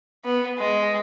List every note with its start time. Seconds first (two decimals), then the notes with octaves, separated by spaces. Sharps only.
0.25 B3
0.58 G#3